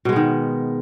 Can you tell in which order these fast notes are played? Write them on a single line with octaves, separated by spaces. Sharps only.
B2 G#3 B3 D#3